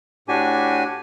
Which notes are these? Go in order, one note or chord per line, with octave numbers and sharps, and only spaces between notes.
A2 D4 F#4 G4 G#5